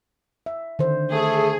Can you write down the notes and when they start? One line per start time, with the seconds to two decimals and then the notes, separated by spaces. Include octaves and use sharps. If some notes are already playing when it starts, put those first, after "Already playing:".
0.46 E5
0.79 D3 D#3 C5
1.12 A3 G#4